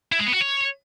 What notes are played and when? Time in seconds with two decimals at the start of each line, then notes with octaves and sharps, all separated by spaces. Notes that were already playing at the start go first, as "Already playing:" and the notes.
0.12 E4
0.19 G#3
0.26 B3
0.34 F#4
0.41 C#5